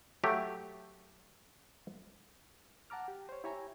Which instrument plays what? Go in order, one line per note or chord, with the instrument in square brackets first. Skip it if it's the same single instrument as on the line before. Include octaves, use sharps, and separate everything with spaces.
[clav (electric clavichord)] F#3 A3 G4
[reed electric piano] F#5 A5 A#5 D6 F6
G4
C5 C#5
E4 G4 C#5 E5 G#5 A#5